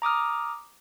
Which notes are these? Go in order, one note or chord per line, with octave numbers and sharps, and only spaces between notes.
A#5 D6 D#6 F6